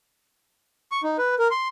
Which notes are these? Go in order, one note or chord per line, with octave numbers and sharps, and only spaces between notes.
C#6
D#4
B4
A#4
C6